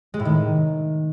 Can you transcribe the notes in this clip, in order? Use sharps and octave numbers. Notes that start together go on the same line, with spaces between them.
G#3
A2
D#3